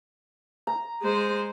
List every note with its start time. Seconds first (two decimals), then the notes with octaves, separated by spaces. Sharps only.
0.67 A#5
1.03 G#3 C5